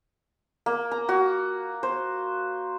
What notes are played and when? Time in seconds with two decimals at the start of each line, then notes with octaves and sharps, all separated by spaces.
0.66 A#3
0.91 A#5
1.09 F#4
1.83 C5